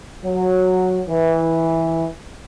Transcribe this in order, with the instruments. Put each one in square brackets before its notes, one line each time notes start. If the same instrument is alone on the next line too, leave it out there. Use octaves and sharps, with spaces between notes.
[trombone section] F#3
E3